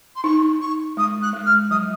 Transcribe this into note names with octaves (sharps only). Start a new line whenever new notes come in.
C6
D#4 C#6
C#6
G#3 D#6
F#6
G#3
F6
F#3 D#6